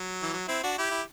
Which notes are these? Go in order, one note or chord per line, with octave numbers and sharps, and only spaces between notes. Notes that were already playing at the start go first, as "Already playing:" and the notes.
Already playing: F#3
E3
F#3
C4 E4
D4 F#4
E4 G4
E4